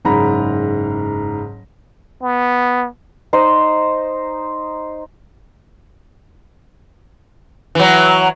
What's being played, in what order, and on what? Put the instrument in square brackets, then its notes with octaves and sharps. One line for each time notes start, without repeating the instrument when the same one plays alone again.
[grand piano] F#1 G#2 A#5 B5
[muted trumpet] B3
[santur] D#4 C5 D#5
[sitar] E3 F#3